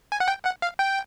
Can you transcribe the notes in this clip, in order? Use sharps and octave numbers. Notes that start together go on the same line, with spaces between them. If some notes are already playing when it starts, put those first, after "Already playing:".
G#5
F#5
G5
F#5
F5
G5